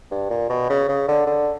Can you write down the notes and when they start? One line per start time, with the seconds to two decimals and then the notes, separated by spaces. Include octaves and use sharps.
0.11 G2
0.30 A#2
0.49 B2
0.70 C#3
0.88 C#3
1.08 D3
1.27 D3